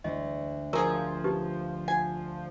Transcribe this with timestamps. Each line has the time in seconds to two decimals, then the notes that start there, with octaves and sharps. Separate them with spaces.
0.04 D2 D#5
0.73 F3 F#3 G#4 A#4
1.24 D#4 G4 B4
1.88 F#5 G#5